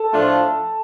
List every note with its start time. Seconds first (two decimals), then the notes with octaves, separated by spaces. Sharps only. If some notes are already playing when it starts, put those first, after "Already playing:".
Already playing: A4
0.12 A2 F3 A3 D4 F4